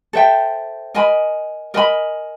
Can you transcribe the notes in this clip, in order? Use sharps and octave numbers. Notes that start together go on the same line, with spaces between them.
A4 C5 E5 G5
A#4 D#5 G#5 B5
A#4 D#5 G#5 B5